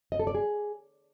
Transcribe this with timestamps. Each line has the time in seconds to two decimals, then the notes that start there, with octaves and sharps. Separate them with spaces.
0.12 D#5
0.19 A4
0.27 D5
0.35 G#4